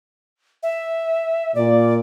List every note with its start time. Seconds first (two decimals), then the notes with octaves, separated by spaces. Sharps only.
0.63 E5
1.55 A#2 D5